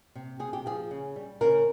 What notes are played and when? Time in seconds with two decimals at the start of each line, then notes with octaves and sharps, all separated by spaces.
0.15 C3
0.39 C3 G#4
0.53 G4
0.66 F3 G#4
0.91 C#3
1.16 G3
1.41 C#3 A#4